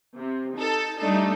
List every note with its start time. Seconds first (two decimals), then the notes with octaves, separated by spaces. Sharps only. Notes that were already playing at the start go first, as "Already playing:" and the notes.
0.17 C3
0.54 D#4 A4
0.98 G3 A3 D4 D#4 A4